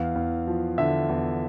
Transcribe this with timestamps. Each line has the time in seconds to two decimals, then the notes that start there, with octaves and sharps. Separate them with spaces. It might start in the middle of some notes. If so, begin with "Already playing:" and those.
Already playing: E2 F5
0.16 E2
0.47 F3
0.78 D3 E5
1.09 E2